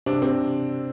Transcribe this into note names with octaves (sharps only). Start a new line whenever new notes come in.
C3 D4
C3 C4